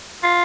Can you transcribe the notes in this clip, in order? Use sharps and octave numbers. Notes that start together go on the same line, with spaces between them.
F4